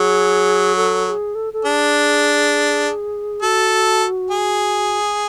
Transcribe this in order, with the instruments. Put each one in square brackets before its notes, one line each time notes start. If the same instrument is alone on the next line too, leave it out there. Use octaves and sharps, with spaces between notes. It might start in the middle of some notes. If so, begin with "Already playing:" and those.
Already playing: [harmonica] F#3 [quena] G#4
[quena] A4
A4
G#4
A4
A4
[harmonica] D4 [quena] G#4
[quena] F#4 [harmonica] A4
[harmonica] G#4